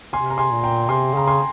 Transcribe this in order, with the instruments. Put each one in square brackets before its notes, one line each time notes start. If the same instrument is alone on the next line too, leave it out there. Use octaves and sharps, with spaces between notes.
[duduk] C3 [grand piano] G#5 C6
[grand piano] A#5
G#5 C6
[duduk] A#2
[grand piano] G5 A#5
[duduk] C3 [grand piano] G#5 C6
[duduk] C#3 [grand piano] A#5
[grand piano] G#5 C6